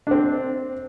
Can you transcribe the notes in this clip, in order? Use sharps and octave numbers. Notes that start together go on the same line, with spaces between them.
C4 D4